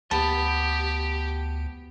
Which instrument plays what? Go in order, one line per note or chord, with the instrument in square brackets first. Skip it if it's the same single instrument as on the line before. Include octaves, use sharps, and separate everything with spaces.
[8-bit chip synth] D2 [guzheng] B3 [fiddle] G4 [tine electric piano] A5